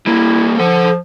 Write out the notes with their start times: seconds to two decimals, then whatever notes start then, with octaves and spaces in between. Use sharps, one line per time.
0.07 G3 A#3 E4
0.59 F3 A4 F#5